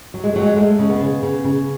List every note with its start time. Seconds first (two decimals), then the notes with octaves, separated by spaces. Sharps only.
0.14 F#3
0.24 G#3
0.33 F#3 A3
0.42 G#3
0.56 G#3 A3
0.79 C#3
0.89 B3
1.01 C#3
1.23 C#3
1.44 C#3